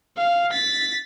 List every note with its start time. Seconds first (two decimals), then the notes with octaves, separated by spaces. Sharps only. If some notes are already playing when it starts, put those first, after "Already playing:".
0.18 F5
0.52 A6 B6